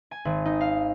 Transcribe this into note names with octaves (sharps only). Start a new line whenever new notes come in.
G#5
G#1
D#4
F5